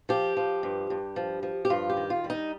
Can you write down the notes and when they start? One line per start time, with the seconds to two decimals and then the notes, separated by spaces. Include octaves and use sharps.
0.09 F3 G4
0.37 F3
0.63 G2
0.90 G2
1.16 F3
1.43 F3
1.65 G4
1.70 G2 F4
1.90 G4
1.97 D#3
2.10 F4
2.24 G3
2.30 D#4